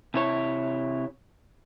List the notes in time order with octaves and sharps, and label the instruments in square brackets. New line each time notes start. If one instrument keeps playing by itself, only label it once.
[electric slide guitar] C3 E4 C#5